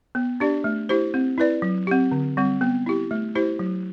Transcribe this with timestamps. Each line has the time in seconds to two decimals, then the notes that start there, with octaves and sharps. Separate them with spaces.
0.15 B3
0.40 D4 G4 D5
0.64 A3
0.89 E4 G4 C5
1.14 C4
1.38 E4 B4 D5
1.62 F#3
1.87 C4 G4
2.11 D3
2.37 G3 C4
2.61 B3
2.86 E4 G4
3.11 A3
3.35 E4 G4 C5
3.59 F#3